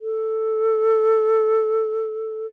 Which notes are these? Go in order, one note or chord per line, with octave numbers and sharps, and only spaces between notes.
A4